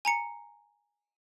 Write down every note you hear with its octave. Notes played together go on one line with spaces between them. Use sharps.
G#5 A#5 C#7